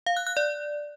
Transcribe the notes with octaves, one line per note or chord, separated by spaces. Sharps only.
F5
F#6
F#6
D5